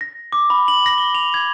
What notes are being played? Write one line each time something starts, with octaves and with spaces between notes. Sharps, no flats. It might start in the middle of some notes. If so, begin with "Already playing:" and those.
A#6
D6
B5
F#7
A#6
G7
F7
G#6